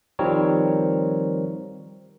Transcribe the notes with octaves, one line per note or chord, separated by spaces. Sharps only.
D#3 F3 G3 C4 A#4 C#5